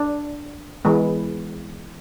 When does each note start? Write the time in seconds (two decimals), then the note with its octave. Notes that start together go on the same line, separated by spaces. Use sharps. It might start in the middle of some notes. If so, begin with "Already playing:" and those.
Already playing: D4
0.85 E3 G#3 B3